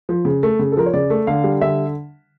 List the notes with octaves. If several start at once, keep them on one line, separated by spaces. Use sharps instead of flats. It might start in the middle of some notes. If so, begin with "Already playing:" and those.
F3
C#3
A3
C#3
A4
F3 A#4
C#5
C#3 D5
A3
D3 F5
G3
D3 E5